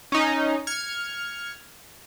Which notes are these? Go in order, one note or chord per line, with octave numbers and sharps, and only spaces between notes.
C#4 D#4
F6 G#6 C#7